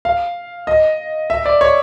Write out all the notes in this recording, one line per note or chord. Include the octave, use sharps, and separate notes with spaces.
F5
D#5
E5
D5
C#5